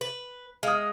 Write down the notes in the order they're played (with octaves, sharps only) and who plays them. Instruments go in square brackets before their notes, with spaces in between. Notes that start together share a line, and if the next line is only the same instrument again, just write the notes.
[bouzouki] B4
[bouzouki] G#3 [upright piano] F5 D#6